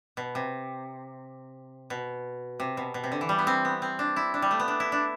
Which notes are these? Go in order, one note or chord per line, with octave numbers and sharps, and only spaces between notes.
B2
C3
B2
C3
B2
B2
C3
D3
E3
G3
B3
C4
B3
C4
D4
E4
D4
G3
A3
B3
D4
E4
D4